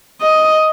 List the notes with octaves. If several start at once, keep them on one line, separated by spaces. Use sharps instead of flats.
D#5